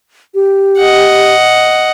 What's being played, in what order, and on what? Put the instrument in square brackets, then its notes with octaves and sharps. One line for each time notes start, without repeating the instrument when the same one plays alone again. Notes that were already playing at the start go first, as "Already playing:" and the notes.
[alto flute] G4
[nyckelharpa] D#5 F#5